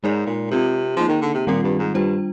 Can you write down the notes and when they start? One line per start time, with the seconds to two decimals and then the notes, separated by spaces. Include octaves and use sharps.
0.04 G#2 G#3 D#4 A#4 D5
0.27 A#2
0.51 C3 C4 F4 A#4
0.96 F3 A#3 D#4 G#4
1.08 D#3
1.22 D3
1.34 C3
1.47 A#2 D#3 G3 C4 F4
1.63 G2
1.79 G#2
1.94 G2 G3 D4 F4 C5